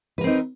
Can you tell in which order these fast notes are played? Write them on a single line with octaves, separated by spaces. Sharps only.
B4 A#4 C4 D#4